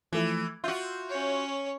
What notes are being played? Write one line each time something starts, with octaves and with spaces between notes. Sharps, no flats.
E3 F3 A3 E4
F4 F#4 E5 C6 G6
C#4 C#5